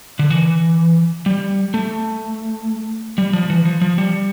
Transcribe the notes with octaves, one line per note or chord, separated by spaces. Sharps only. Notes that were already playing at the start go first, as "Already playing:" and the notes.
D3
E3
G3
A3
G3
F3
E3
F3
F3
G3